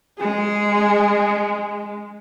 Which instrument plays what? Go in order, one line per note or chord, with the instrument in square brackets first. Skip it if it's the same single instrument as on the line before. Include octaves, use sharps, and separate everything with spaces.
[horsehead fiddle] G#3 [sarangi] G#4